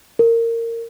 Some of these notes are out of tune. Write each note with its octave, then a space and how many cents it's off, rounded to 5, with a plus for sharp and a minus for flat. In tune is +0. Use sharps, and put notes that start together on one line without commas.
A#4 -20